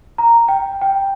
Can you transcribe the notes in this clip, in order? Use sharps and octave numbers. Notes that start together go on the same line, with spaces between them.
A#5
G5
G5